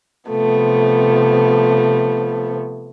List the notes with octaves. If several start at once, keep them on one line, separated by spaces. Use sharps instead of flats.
C3 F3 A3 B3